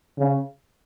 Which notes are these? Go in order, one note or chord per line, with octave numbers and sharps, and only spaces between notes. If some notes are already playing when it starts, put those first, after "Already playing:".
C#3